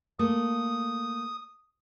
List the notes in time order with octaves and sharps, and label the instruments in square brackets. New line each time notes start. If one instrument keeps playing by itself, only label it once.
[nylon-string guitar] A3 A#3 [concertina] D#6